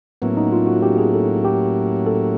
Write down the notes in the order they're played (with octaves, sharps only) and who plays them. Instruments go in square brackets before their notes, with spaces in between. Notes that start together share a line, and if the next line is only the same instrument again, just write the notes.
[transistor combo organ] A2 F#3 A#3 C#4 E4 [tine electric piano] B3
[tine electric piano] D#4
F4
F#4
G4
G#4
A4
G4
A4